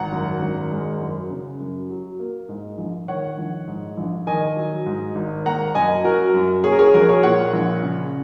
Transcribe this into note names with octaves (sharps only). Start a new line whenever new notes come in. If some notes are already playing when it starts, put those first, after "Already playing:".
Already playing: G#1 F#5 A#5
F#2
G#1
G#3
F#2
C#3
F#2
F#3
A#3
G#2
A#1
D#3 C#5 F#5
A#1
G#2
A#1
D#3 D#5 G#5
F#3
G#2
G#1
A#3 F#5 A#5
F#2 D#5 G#5
F#3 F#4 A#4
F#2
A#3 G#4 C#5
A#4
G#4 C#5
A#1 F#4 A#4
G#4 C#5
A#2 C#5 F#5
A#1
C#3